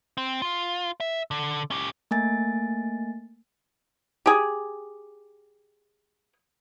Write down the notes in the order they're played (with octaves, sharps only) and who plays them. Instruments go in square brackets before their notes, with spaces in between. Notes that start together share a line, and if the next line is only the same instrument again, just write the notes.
[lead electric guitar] C4
F4
E5
D3
C#4 G4
[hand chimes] A3 A#3 G#5 A6
[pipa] G4 G#4